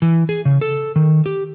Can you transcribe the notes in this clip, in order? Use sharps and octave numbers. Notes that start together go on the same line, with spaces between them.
E3
G#4
C#3
A4
D#3
G4